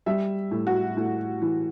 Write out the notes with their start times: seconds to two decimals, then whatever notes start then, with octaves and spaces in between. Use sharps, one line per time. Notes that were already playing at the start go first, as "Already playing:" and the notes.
0.06 G3 E5
0.51 A2
0.67 F#4
0.97 A2
1.42 E3